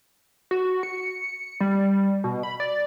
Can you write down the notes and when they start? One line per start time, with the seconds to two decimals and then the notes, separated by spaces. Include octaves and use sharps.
0.51 F#4
0.83 C#7
1.61 G3
2.24 B2
2.43 B5
2.60 D5